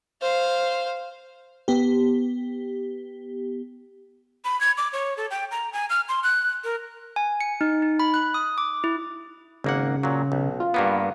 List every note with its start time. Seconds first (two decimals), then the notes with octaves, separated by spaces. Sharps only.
0.22 C5 F5
1.68 B3 G4
4.45 B5
4.61 G#6
4.78 D6
4.93 C#5
5.17 A4
5.31 G5
5.51 A#5
5.73 G#5
5.90 F6
6.09 C6
6.23 F#6
6.64 A#4
7.16 G#5
7.41 C#7
7.61 D#4
7.82 D#4
8.00 B5
8.14 F#6
8.34 D#6
8.58 D6
8.84 E4
9.64 G#1 C#3 A#3 F#5
10.03 A#2 F#3
10.32 B1
10.60 F4
10.74 G2 A#3 B3